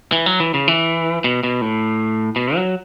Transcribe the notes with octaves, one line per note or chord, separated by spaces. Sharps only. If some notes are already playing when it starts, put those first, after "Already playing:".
E3
F#3
E3
C#3
E3
B2
B2
A2
B2
F#3